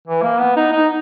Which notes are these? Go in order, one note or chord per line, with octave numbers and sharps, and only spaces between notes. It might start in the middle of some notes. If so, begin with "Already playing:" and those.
E3
A#3
B3
D#4
D#4